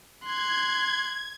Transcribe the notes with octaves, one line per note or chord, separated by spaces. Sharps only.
C6 F#6 G#6